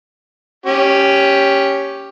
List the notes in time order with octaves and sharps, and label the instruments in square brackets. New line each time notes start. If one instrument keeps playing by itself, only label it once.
[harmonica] C#4 G4